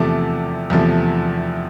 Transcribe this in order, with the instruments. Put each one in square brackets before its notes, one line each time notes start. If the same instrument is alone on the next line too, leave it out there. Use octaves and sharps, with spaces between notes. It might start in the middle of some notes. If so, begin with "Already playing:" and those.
Already playing: [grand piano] E2 C3 F3 A3 D6
E2 C3 F3 A3